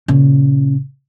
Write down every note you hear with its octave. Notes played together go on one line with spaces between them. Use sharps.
A#2 C#3